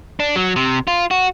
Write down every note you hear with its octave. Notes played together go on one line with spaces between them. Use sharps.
D4
F#3
C3
F4
F#4